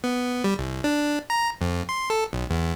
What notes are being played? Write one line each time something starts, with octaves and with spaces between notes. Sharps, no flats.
B3
G3
C2
D4
A#5
F2
C6
A4
B1
E2